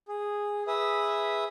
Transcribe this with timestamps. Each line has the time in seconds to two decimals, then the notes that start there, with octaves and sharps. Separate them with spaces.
0.08 G#4
0.67 G#4 B4 E5 D#6